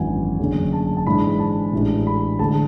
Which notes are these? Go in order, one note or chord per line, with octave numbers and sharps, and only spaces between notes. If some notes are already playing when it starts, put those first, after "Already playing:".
Already playing: G#1 F#2 E3 B3 D4 F#5 G#5
F#1 F#2 D3 A3 C#4
A5
A5
G#2 E3 G#3 D4 B5
A5
A1 A2 E3 G#3 D4
B5
D2 D3 G#3 D4 A5